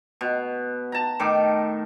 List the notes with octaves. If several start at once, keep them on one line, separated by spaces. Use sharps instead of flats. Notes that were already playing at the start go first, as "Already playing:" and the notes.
B2
A5 A#5
A2 D#3 D6